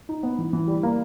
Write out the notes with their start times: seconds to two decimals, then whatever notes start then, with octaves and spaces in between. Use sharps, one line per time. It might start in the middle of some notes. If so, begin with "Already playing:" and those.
0.09 D#4
0.23 B3
0.38 E3
0.53 E3
0.67 G3
0.83 A#3